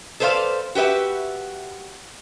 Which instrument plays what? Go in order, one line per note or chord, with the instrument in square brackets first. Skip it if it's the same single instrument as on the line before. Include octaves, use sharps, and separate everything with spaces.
[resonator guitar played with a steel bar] A4 B4 C5 D5 F5
F#4 G4 B4 E5